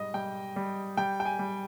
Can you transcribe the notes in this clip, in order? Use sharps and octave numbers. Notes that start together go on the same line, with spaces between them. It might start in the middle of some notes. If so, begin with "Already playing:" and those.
Already playing: G#2 G3 D#5
G3 G5
G3
G3 G5
G5
G#5
G3